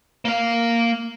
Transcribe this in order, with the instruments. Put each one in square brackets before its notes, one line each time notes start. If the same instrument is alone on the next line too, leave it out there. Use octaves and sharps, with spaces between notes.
[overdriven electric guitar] A#3 F5